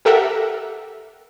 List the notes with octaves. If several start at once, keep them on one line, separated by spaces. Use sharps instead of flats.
G4 A4 A#4 E5 F#5